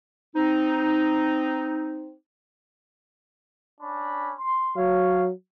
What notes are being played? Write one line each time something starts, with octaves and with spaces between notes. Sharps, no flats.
C4 D#4
C#4 D4 B5
C6
F#3 C#5 F5